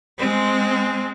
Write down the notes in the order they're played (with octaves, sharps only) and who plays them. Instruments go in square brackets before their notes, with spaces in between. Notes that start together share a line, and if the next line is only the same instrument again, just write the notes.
[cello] G#3 C4